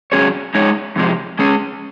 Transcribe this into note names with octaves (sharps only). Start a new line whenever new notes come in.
G#2 F#3 C#4 G#4 C#5
G#3 D#4 G#4 C#5
F2 C3 F3 G#3
G#3 C#4 G#4